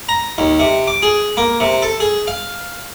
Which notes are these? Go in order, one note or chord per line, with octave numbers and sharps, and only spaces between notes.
A#5
D#2
C3
D6
G#4
A#3
C3
A4
G#4
F5